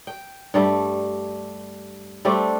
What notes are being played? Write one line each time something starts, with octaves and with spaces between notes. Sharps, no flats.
G5
G2 G3 A3
G3 A3 C4 D4